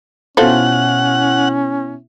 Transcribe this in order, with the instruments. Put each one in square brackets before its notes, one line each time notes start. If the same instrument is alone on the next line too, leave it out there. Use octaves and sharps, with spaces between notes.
[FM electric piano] B2 E4 [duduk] C#4 [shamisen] F4 A4 C5 [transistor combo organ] F#5